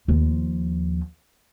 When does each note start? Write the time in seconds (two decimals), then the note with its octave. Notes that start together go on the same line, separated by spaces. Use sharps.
0.08 D#2 F3